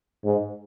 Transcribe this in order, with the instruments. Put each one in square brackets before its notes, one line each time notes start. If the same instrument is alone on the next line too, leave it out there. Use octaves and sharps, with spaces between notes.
[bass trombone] G#2